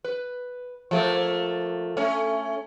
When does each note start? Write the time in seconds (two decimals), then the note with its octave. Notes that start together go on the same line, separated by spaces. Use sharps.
0.04 B4
0.91 F3 A3 A#3
1.97 A3 C#4